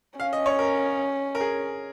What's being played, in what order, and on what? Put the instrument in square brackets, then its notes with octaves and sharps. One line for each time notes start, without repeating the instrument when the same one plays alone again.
[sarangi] C#4 [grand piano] F5
[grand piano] D#5
C#5
A#4
A#4
G#4